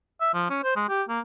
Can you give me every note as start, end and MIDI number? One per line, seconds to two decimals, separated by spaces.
0.21 0.31 76
0.34 0.45 53
0.50 0.63 61
0.64 0.73 72
0.76 0.87 56
0.89 1.03 67
1.09 1.20 58